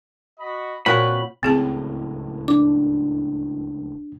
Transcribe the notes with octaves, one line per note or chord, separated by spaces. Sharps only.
F#4 D#5 B5
A#2 C4 F#4 A#4 B4 C#5 B5
D1 C#2 A2 C4 G#4 A5
D4 D6